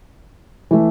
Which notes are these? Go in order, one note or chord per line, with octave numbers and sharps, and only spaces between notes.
E3 A3